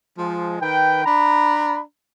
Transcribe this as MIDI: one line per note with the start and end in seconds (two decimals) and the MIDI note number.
0.18 0.56 53
0.18 0.56 56
0.61 1.03 51
0.61 1.03 71
0.61 1.03 79
1.05 1.80 62
1.05 1.80 82
1.05 1.80 83